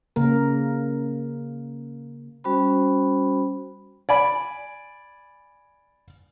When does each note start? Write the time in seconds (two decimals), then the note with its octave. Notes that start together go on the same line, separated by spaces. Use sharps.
0.16 C#3 A#3 A#4
2.44 G3 C#4 F#4 C5 B5
4.09 D5 G#5 B5